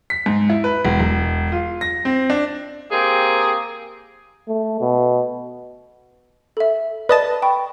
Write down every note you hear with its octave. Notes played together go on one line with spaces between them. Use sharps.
B6
G#2
E4
B4
E1
E1
F4
A#6
C4
D4
A#3 C4 G4 G#4
A3
B2
A4 E5
B4 D5 D#5 A5
G5 B5 C#6